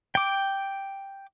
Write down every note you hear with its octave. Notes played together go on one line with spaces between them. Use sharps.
G5 D6